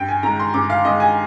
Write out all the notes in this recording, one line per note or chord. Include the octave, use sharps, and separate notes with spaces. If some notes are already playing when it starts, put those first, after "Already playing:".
Already playing: G2 G5
G#5
D#3 G#3 A#5
C6
G2 D6
F5
D#3 G#3 D#5
G#5